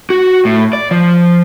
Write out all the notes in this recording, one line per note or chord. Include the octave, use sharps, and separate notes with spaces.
F#4
A2
D5
F3